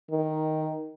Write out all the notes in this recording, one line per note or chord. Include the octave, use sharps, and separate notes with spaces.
D#3